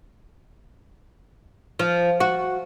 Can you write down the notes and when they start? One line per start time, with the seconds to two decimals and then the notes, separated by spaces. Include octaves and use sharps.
1.79 F3
2.20 F#4